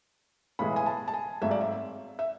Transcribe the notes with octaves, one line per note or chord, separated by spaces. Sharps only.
B1 A2 E3 G#3 B5
G#5
A5
A5
G#5
G#1 G#2 F#3 A3 E5
D5
E5
E5